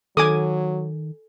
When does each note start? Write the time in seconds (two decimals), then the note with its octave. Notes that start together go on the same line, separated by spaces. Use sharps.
0.17 D#3 F#3 A4 G#5 D6 D#6